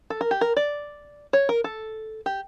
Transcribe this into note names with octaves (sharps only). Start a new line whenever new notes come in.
A4
A#4
G4
A#4
D5
C#5
A#4
A4
G4